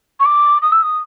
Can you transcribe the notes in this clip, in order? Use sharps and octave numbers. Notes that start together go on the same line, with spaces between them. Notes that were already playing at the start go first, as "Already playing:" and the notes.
C#6
D6
D#6
E6
D#6